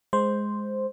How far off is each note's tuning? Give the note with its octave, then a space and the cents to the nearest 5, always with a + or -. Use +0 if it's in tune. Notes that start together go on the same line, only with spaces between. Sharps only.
G#3 +0 C5 +0